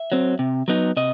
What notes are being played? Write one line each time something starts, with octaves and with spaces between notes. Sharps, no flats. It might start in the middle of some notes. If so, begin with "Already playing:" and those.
Already playing: E5
F#3 C4
C3
F#3 B3 D#4
C3 D#5